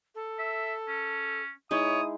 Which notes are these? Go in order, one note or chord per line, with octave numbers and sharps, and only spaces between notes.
A4
E5
C#4
G#3 D#4 E4 C#5 D#6